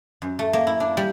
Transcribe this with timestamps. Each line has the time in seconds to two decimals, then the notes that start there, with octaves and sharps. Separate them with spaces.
0.22 F#2
0.39 A3
0.53 A#3
0.67 E4
0.80 D4
0.97 G3